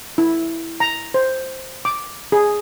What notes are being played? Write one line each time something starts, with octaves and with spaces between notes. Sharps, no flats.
E4
A#5
C5
D6
G#4